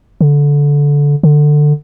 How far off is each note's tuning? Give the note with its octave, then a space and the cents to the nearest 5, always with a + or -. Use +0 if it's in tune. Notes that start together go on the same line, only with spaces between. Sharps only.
D3 -20
D3 +15